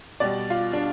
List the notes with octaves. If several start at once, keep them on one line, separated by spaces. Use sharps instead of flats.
B2 G3 D5
F4
D4